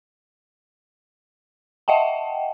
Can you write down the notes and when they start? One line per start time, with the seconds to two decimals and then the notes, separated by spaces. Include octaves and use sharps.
1.88 D#5 E5 F#5 G5 A5